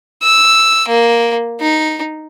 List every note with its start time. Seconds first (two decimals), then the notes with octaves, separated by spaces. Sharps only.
0.23 E6
0.88 A#3
1.61 D#4